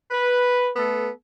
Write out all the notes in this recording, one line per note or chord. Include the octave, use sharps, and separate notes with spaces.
B4
A3 B3 A4